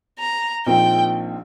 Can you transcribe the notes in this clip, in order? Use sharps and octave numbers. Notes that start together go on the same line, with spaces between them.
A#5
A#1 A#2 F3 C4 D#4 G5